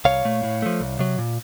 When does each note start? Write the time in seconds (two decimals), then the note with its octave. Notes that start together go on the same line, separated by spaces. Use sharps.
0.05 C2 C#5 F5
0.25 A#2 A3
0.43 A2
0.62 F3 A3
0.81 C2
0.99 C3 F#3
1.19 A#2